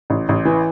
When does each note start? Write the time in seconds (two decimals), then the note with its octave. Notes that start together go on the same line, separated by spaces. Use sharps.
0.10 A1
0.29 A1
0.45 E3